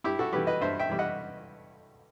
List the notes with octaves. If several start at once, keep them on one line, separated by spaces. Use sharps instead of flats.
G2 E4 G4
F#4 A4
E3 G3 G4 B4
B4 D#5
G2 C5 E5
E5 G5
E3 G3
D#5 F#5